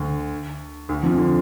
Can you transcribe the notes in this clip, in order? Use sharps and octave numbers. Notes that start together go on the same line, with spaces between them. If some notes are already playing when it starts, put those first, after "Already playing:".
Already playing: D2 D3
D2 D3
F2 F3
D3